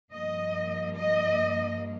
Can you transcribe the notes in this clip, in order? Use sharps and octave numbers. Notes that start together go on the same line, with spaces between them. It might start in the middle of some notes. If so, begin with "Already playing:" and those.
G2 F3 A#3 D#5
D#5